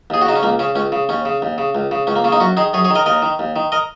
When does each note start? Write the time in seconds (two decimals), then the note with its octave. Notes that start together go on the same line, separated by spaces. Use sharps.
0.10 D#2 G#4
0.21 F#4
0.26 C#3 D#4
0.36 C#4
0.43 C#2 A#3
0.59 C#3 C#4
0.75 C#2 C#4
0.92 C#3
1.09 D#2 C#4
1.25 C#3
1.42 D#2
1.58 C#3
1.75 C#2
1.91 C#3
2.07 C#2 C#4
2.16 A#3
2.24 C#3 C#4
2.32 A#3 D#4
2.40 F#2 C#4 F#4
2.57 D#3 D#4 G#4
2.73 F#2 G#4 C#5
2.85 G#4 C#5
2.90 D#3
2.95 A#4 D#5
3.06 D#2 A#4 D#5
3.22 D#3
3.39 D#2
3.56 D#3
3.72 A#4 D#5